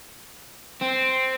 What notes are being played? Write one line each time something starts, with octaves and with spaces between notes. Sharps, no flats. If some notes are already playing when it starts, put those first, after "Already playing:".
C4